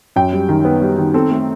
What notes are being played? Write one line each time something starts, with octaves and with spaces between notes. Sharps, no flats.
F#2 G5
G3
D#3
B3
G3
D#3
C4 A4
A3